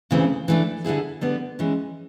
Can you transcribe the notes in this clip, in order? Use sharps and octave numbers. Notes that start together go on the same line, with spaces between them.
D2 C#3 E3 G3 C4
E3 A3 D4
D3 G3 B3 E4 G#4
D3 G3 B3
E3 G#3 C#4